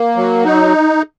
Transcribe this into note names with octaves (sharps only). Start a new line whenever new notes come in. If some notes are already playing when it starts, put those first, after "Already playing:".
Already playing: A#3
F#3
D#4